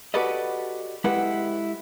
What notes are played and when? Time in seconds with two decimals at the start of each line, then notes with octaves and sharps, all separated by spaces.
0.14 F#4 G4 A4 B4 D5 D#5
1.04 G#3 E4 G4 A4 B4 F#5